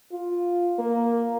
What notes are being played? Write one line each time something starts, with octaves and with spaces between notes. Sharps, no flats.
F4
A#3